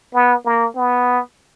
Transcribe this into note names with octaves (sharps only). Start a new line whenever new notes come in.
B3
A#3
B3